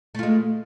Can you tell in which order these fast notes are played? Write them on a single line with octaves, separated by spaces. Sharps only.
A3 F4 G#3